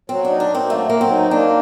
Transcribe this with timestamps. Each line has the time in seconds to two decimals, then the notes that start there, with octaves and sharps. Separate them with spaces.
0.09 F#3 C4
0.25 D4
0.30 D#4
0.40 D4
0.50 A#3 C4
0.70 F#3 A3
0.89 F#3 A#3
1.01 C4
1.11 D#4
1.31 A#3 D4